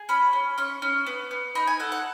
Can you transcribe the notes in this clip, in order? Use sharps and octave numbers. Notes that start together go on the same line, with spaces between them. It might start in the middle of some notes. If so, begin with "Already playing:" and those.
Already playing: G#4
C#4 B5
C#4
C#4 C#6
C#4
B3
B3
D#4 B5
G#5
A4 F#5
F#5